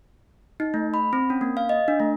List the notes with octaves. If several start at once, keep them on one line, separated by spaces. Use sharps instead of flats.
D#4
A3
B5
C4
C#4
A#3
F5
D#5
D4
A3